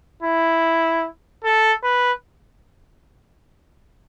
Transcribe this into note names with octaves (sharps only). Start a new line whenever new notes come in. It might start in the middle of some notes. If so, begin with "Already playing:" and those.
E4
A4
B4